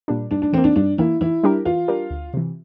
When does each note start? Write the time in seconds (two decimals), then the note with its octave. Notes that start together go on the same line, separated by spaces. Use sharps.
0.08 A#2 G3 D4
0.31 G2 D4
0.42 D4
0.53 E3 C4
0.58 A#3
0.64 D4
0.76 G2 D4
0.98 E3 A#3 E4
1.21 E3 E4
1.44 G3 D4 G4 A#4
1.65 E3 F4
1.88 G3 D4 G4 A#4
2.10 D2
2.34 C3 E3